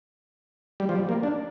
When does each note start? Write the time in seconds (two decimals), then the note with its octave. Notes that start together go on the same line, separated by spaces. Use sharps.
0.80 G3
0.89 F3
0.95 G3
1.09 A#3
1.23 D4